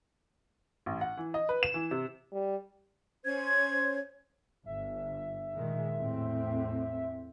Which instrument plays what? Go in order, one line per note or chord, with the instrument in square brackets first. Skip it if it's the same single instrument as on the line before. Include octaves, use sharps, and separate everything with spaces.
[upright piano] A1
F#5
E3
D#5
B4
E7
E3
C3
[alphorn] G3
[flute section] C#4 C5 C#5 G#6
[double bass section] G1 [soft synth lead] E5
[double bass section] A#2 D#3 G#3
E2 A2 C4